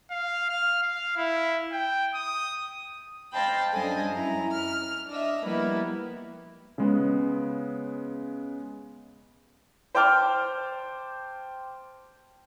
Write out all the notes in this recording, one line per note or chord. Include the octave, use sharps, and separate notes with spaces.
F5
F6
F5
E4
G5
D#6
C5 D#5 F5 G5 A5 B5
F#2 G3 D4 A4 D#5 G#5
F#2 E4 A#5
F6
D4 D#5 E5
F3 G3 A#3 B3 E4
C#3 G#3 B3
C5 G5 A5 D6 F6